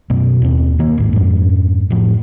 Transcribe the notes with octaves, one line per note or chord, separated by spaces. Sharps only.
F#2 B2
D#2 C4
D#3 A#3
A1 G#2
F2 G#2
A2 F3